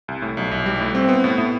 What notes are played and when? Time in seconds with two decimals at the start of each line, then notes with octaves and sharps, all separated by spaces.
0.08 C2
0.22 A2
0.37 B1
0.51 B1
0.66 G3
0.81 A2
0.95 C4
1.09 B3
1.24 A2
1.38 A2